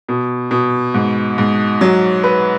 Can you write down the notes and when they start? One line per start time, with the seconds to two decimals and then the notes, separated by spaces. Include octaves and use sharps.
0.08 B2
0.51 B2
0.94 G#2
1.38 G#2
1.81 F#3
2.24 B4